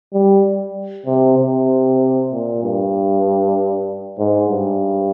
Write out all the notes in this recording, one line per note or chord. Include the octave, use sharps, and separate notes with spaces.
G3
C3
C3
A#2
G2
G#2
G2